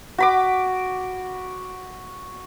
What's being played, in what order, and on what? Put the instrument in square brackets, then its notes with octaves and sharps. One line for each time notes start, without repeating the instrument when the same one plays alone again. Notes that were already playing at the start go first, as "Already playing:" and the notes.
[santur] F#4 B5 D6